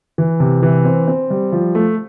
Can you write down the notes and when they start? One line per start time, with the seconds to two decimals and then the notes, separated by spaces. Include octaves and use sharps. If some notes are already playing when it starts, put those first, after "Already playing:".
0.18 E3
0.40 C3
0.63 E3
0.85 C4
1.08 C4
1.30 G3
1.52 F3
1.75 A3